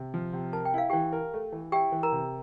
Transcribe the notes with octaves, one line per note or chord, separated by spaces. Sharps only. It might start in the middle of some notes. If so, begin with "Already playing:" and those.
Already playing: C3
F3
C3
A#4 A5
G5
E4 F5
E3 G4 G5
A#4
A3
E3
E4 G4 G5
E3
A#4 A#5
C3